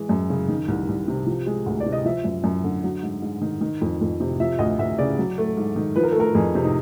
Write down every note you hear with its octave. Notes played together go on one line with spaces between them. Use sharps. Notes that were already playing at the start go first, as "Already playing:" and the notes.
Already playing: E3 G#3
F#2
C#3
D#3
C2
C2
C3
F3
G#3
D2
D5
C3
D#5
F3 E5
F#2
F#2
D3
F#3
G#2
G#2
D#3
D#3
F2
F2
C3
F3 E5
D2 D#5
D2 E5
C#3 D5
F#3
A3
G#2
D#3
F3 B4
A#4
A4
A3 A#4
F2 G#4
C3
D#4